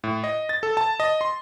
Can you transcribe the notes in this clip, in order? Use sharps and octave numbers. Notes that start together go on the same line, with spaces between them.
A2
D#5
A6
A4
A5
D#5
C6